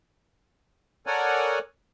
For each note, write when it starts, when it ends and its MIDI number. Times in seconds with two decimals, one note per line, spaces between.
1.07 1.59 69
1.07 1.59 70
1.07 1.59 73
1.07 1.59 74
1.07 1.59 78
1.07 1.59 80